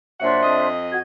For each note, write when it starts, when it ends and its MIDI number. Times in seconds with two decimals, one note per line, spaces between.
0.20 0.41 46
0.20 0.41 54
0.20 0.67 62
0.20 0.67 72
0.20 0.67 76
0.20 0.41 78
0.43 1.01 41
0.43 1.01 75
0.91 0.98 66
0.91 0.98 92